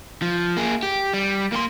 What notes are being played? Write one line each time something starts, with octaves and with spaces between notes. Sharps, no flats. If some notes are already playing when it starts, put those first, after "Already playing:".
F3
A#3 G#4
G4
G3
A#3 C6